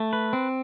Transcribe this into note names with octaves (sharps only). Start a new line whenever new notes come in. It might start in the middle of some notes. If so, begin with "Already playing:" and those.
Already playing: A3
B4
C4